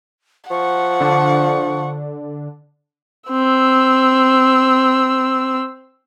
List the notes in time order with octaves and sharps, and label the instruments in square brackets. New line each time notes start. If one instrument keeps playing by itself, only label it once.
[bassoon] F3 [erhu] F#5 [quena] C#6
[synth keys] D3 D4
[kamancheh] C4 E6